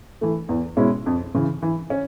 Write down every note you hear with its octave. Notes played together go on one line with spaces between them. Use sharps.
E3 A3
E2
B2 G#3 C#4 E4
F2
C#3 E3
E3
C#4